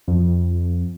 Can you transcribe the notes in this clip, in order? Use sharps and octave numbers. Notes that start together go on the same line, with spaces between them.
F2